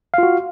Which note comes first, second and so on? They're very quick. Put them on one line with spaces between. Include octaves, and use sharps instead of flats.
F5 F4 F#4